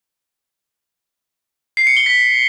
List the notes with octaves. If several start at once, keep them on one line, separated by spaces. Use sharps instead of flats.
C7
C#7
G7
B6